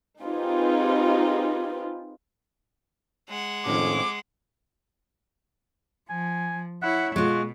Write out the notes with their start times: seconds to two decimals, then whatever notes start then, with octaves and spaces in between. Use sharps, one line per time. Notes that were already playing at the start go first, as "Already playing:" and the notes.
0.23 C4 D#4 F4 G4 G#4 B4
3.29 G#3 F#5
3.66 F2 A2 D#3 C#4 D6
6.10 F3 G#5
6.83 E4 C#5 F#5
7.16 B2 G#3 F4 F#4